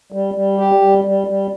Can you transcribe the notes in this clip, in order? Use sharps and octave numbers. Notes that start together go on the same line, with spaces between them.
G3
G3
G4
G3
G3
G3